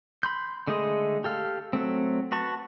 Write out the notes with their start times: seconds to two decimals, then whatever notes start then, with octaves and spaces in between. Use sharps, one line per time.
0.23 B5 C6 G6
0.67 D3 G#3 A3 G#4 D#5
1.24 G4 A4 F5
1.73 F#3 A3 C4
2.32 F#4 B4 A5 C#6